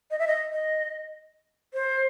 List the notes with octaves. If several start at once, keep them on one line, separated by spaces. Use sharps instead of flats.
D#5
E5
D#5
D#5
C5